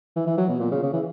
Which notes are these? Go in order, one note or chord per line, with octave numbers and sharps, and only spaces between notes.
E3
E3
F#3
B2
A#2
C#3
C#3
E3